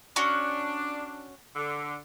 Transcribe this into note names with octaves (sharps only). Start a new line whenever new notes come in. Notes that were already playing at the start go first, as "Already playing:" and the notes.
C#4 D4 F#4
D3